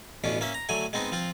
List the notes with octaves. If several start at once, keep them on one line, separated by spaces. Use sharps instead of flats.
A1 B2 B3 C#4 D4
A#3 C#4 E5
A#5
D3 F#3 A3 G#5
G#3 B3 C4 D#4
F3 C4 F4